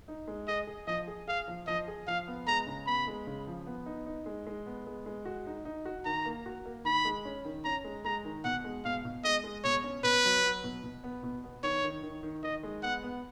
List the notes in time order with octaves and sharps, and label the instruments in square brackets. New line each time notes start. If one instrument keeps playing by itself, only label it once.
[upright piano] D#4
G#3
[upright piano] G#4 [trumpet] D#5
[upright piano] G#4
[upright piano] F3 [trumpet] D#5
[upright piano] G#4
[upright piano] G#4 [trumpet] F5
[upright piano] F3
[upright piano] F3 [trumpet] D#5
[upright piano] G#4
[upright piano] F3 [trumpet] F5
[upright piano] B3
[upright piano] G#3 [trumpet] A#5
[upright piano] C#3
[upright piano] B3 [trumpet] B5
[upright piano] G#3
C#3
F3
B3
D#4
D#4
G#3
G#3
B3
G#3
G#3
F#4
D#4
D#4
F#4
[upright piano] D#3 [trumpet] A#5
[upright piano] A#3
F#4
A#3
[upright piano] D#3 [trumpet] B5
[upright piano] G#3
C#4
D#3
[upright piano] C#4 [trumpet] A#5
[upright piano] G#3
[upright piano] G#3 [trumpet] A#5
[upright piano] D#3
[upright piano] B2 [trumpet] F#5
[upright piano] G#3
[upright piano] B2 [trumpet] F5
[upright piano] B2
[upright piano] G#3 [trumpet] D#5
[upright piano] G#3
[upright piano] B2 [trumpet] C#5
[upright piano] C#4
[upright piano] B2 [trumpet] B4
[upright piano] F#3
F#3
B2
B2
B3
B2
B3
[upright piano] D#3 [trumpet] C#5
[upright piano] D#3
D#3
D#3
[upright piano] D#3 [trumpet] D#5
[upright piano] G#3
[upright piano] B3 [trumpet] F#5
[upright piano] B3